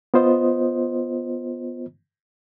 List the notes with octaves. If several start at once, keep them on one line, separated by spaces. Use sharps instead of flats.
B3 F4 C5 D#5